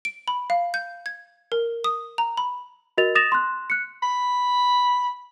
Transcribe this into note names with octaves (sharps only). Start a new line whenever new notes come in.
D7
B5
F5
G6
G#6
A#4
D#6
A#5
B5
F#4 A#4 D#5 A6 F7
D#6 A6 A#6 E7 F7
C6 F#6
F#6 C#7
B5